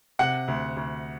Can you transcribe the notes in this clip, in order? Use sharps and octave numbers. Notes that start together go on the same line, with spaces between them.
C3 F#5
D2
D2